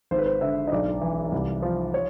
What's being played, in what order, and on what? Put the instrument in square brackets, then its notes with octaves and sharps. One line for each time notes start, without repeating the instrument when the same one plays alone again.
[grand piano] G#1 C5
B4
C5
D3 E5
D#5
B1 D5
E3
C2
F3
C#5